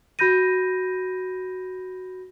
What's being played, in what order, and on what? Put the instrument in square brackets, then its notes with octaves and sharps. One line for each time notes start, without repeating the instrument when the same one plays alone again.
[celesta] F#4 B5 G6 A#6 D#7